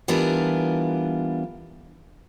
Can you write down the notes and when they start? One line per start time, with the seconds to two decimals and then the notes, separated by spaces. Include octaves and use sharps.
0.08 E3 G3 B3 D4 F4 A#4